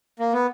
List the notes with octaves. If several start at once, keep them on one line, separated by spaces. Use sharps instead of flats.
A#3
B3